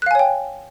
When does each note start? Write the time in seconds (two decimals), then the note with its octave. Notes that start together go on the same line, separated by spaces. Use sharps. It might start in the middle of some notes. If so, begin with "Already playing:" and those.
0.02 F#6
0.06 F5
0.11 G#5
0.15 C#5
0.19 G5